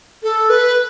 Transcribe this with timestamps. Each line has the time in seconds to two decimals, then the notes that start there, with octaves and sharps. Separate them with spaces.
0.23 A4
0.50 B4